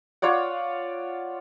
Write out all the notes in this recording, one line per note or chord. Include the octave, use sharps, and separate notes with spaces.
F4 C#5 D5 F#5